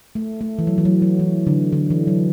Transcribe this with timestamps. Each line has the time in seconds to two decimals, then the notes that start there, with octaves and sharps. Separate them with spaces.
0.15 A3
0.41 A3
0.59 E3
0.67 F#3
0.78 E3
0.85 F#3
1.02 F#3
1.19 E3
1.47 D3
1.72 D3
1.90 E3
2.07 F#3